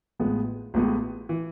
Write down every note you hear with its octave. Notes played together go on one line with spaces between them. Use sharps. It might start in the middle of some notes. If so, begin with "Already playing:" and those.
A1 A2 F3 G#3 B3
A1 A2 F3 G#3 B3
E3